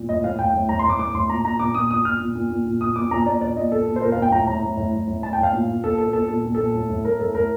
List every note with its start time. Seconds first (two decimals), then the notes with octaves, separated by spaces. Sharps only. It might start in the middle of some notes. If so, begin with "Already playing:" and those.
Already playing: A#2
0.09 A2 D#5
0.24 A2 F5
0.39 A2 G5
0.54 A2
0.69 A2 A#5
0.79 C6
0.84 A2 D6
0.99 A2 D6
1.14 A2 C6
1.29 A#2 A#5
1.45 A#2 A#5
1.59 A#2 D6
1.75 A#2 D#6
1.90 A#2 D#6
2.05 A#2 F6
2.20 A#2
2.35 A#2
2.51 A#2
2.66 A#2
2.81 A#2 D#6
2.96 A#2 D6
3.11 A#2 A#5
3.26 A#2 D5
3.41 A#2 D5
3.56 A#2 D#5
3.71 A#2 A4
3.87 A#2
3.96 C5
4.02 A#2 A#4
4.12 A#2 F5
4.22 G5
4.32 A2 A#5
4.47 A2 A#5
4.62 A2
4.77 A2
4.93 A2
5.07 A2
5.23 A2 A5
5.33 G5
5.38 A2 F5
5.53 A#2
5.69 A#2
5.84 A#2 A4
5.98 A#2 A4
6.13 A#2 A4
6.28 A#2 A4
6.44 A#2
6.55 A#2 A4
6.74 A2
6.90 A2
7.04 A2 A#4
7.20 A2 A4
7.34 A2 A#4